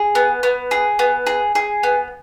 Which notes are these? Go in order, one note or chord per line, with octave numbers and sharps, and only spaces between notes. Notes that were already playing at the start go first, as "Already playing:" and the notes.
Already playing: G#4
B3
B3
G#4
B3
G#4
G#4
B3